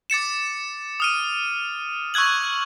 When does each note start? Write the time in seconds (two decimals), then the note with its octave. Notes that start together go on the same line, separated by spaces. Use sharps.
0.10 D6 A6 C#7 E7
1.00 D#6 F6 D#7
2.14 C#6 E6 F#6 G#6 F#7